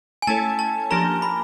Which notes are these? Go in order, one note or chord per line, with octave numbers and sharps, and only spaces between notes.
G#5
A3 C#4 E4 A4 C#5 A5
A5
F3 A#3 D4 G4 A#4 A#5
B5